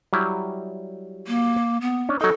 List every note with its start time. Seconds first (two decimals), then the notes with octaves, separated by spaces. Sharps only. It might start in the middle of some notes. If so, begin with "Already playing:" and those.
0.13 F#3 G3 E4
1.27 A#3
1.81 B3
2.09 C#4 D4
2.21 F#3 D#4 A4